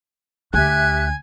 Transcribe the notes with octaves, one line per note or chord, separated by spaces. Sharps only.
D2 G4 E5 G#5 F#6